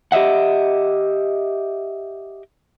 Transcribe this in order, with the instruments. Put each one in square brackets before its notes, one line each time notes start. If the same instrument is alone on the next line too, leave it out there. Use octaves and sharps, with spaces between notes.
[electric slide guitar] G4 D#5 E5 F#5